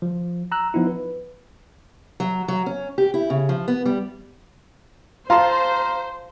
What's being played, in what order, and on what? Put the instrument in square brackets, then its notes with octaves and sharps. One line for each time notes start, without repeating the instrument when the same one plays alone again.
[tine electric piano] F3
A#5 E6 F#6
F3 B3 D#4 E4
B4
[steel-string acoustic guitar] F#3
F#3
C#4
G4
E4
C#3
F3
B3
G3
[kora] F4 A4 [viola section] C5 [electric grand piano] F5 A#5 C6